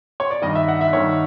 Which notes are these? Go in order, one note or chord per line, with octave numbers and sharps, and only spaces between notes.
C#5
D5
G2 D#3 D#5
E5
F#5
E5
G2 D#3 C#5